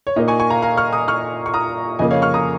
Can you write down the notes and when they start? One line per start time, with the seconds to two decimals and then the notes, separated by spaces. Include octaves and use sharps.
0.07 C#5
0.16 A#2 A#3 D#4 D#5
0.28 G#5 C#6
0.40 G#5 C#6
0.50 F5 A#5
0.62 F5 A#5
0.77 C#6 F6
0.93 A#5 D#6
1.08 C#6 F6
1.46 C#6
1.54 A#5 D#6
1.99 F2 C#3 A#3 D#5 G#5
2.11 C#5 F5
2.22 C#6 F6
2.34 A#5 D#6